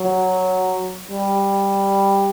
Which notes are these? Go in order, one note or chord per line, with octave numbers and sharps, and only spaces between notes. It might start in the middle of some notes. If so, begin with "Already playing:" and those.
Already playing: F#3
G3